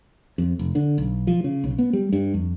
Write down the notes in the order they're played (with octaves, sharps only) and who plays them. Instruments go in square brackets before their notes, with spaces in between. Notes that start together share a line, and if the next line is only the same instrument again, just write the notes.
[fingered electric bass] F2
F1
D3
B1
F3
C#3
B1
B3
G3
G2
F2